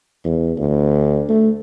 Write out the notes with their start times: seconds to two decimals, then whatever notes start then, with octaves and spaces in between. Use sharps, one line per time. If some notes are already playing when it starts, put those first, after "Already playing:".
0.24 E2
0.58 D2
1.29 A3